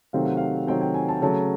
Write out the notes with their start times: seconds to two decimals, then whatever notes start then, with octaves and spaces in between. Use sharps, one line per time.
0.13 C3 D#3 F#3 A3 C4 F5
0.25 F#5
0.37 F5
0.67 C3 D#3 F#3 A3 C4 G5
0.81 G5
0.94 G#5
1.09 A5
1.22 C#3 F#3 A3 A5